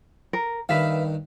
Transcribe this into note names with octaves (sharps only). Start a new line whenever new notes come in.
A#4
G2 D#3 B4 E5 F5